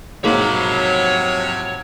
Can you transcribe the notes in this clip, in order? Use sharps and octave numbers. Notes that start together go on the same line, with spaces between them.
G#2 C3 F3 F#3 A#3 C#5 B5